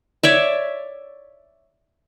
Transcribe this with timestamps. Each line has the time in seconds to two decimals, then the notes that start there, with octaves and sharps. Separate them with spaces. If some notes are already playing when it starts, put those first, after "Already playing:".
0.23 C#5 D5 E5